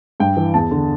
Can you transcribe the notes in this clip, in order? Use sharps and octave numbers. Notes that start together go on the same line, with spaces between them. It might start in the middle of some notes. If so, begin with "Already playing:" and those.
G2 G5
E3
E2 A5
D3